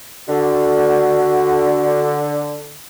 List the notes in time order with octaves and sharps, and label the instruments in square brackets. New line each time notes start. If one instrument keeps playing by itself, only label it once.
[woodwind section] D3 [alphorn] F#4